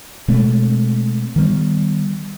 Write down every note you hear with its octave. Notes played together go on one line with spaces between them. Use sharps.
B2 G#3 A3 C4
D#3 G3 B3